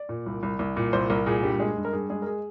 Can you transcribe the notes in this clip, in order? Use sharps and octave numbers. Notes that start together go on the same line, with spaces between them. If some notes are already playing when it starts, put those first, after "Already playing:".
Already playing: D5
A#2
C2
C2
C2
A#2
C2 C5
C2 A#4
A#2 G#4
G2 G4
G#3 G#4
G2
A#4
G2 G#4
G#3 G#4
A#4
G#4